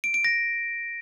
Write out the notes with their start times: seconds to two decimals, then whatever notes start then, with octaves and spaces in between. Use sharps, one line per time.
0.04 D7
0.14 D7
0.24 A#6